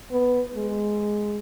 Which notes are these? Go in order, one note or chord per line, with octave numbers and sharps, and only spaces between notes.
B3
G#3